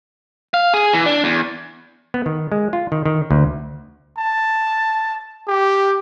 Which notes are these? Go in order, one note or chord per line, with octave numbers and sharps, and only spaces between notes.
F5
G#4
E3
D4
E2
B3
D#3
G#3
F4
D#3
D#3
D2
A5
G4